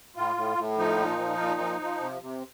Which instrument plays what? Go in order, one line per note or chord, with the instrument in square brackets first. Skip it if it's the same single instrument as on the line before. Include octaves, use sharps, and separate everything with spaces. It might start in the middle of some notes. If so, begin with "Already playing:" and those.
[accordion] A2 F4
A2
A2
F3 D#4
A#2
F3
A#2
F3
F3
C3
C3